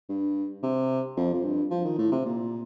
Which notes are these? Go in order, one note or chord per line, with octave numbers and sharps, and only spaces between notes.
G2
C3
F2
F2
G2
F3
D#3
A2
C3
A#2